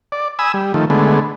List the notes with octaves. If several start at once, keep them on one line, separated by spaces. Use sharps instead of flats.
D5
G#5 B5 D#6 E6
G3
D#3 F3 A3
D3 G#3 A3 B3